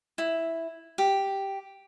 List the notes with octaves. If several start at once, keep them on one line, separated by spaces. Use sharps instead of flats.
E4
G4